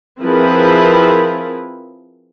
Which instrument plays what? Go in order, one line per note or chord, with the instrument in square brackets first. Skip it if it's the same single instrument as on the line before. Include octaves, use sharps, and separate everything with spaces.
[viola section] F3 C4 E4 G#4 A#4 B4